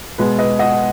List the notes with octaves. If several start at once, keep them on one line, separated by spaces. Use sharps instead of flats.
B2 G#3 B4
B4 D#5
D#5 F#5